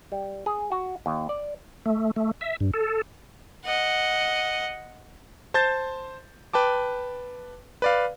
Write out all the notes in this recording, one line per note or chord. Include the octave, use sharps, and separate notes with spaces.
G3
G#4
F#4
D#2
D5
A3
A3
E5
G2
A4
D#5 F#5
C5 A5 C6 G6 A6
B4 G5 A5 D6
B4 D5 F5